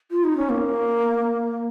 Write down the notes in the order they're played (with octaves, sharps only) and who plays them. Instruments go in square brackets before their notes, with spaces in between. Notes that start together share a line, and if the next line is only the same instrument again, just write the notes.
[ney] F4
D#4
C#4
A#3